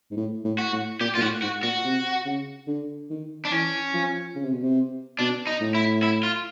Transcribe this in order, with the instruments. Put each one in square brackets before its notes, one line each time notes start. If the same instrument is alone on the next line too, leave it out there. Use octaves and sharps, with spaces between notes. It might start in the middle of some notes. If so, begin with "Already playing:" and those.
[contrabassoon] G#2
A2
A2
[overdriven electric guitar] F#4
[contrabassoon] A2
[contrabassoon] A#2 [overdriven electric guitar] G4
[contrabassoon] A#2 [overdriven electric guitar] F4
[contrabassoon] A2 [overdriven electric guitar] F#4
[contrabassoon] G#2 [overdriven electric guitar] F#4
[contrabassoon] A#2 [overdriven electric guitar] F#4
[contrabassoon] C3
C#3
D3
D#3
[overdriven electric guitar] D4
[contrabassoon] E3 [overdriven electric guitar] C#4
[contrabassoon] F3
C#3
C3
B2
C3
[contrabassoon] B2 [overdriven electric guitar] D4
[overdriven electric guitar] D#4
[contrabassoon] A2
[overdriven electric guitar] E4
E4
F4